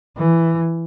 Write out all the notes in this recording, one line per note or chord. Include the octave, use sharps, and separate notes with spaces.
E3